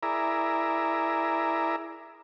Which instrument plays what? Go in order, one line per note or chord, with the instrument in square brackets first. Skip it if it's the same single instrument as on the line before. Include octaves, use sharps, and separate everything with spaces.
[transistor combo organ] E4 G#4 A#4 D5 E5 A#5